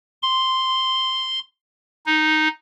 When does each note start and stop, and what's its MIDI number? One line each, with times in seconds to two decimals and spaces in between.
0.23 1.39 84
2.06 2.48 63